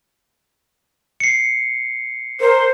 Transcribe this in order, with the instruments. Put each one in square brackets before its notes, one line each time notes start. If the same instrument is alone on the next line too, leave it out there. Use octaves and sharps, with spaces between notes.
[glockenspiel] C7 C#7
[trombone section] A#4 [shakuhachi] C5